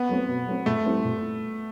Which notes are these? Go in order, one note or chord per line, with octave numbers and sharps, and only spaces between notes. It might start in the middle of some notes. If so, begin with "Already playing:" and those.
Already playing: B3
F#3 A3 C4
B2
F#3 A3 C4
A#2 A3
G3 C4 E4
A#2